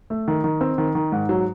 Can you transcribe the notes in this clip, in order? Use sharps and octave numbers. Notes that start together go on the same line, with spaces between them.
A3
D#3
D#3
C4
D#3
D#3
G#2
F#3